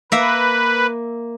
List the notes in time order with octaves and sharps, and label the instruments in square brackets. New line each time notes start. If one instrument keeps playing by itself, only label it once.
[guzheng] A#3 E5 [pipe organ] B4